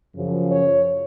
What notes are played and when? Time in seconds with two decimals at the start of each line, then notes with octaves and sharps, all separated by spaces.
0.14 F#2 C#3 F3
0.50 C#5